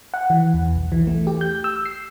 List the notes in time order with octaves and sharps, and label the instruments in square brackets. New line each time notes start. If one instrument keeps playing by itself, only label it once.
[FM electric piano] F#5
E3
E2
B1
E3
A3
G4
G6
E6
C7